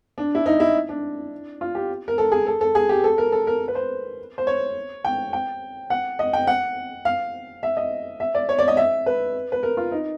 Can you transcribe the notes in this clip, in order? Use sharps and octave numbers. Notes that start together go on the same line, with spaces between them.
D4
E4
D#4
E4
D4
F4
G4
A#4
A4
G#4
A4
A4
G#4
G4
A4
A#4
A4
A#4
B4
C5
C5
C#5
G5
G5
F#5
D#5
G5
F#5
F5
E5
D#5
E5
D5
C#5
D5
D#5
E5
B4
B4
A#4
F4
D#4